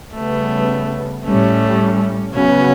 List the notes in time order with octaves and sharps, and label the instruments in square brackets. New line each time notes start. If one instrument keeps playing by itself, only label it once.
[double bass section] C#3 G3 B3 [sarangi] A3
[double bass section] A2 G3 C#4 [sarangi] A3
[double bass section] C#3 F#3 B3 [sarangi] C#4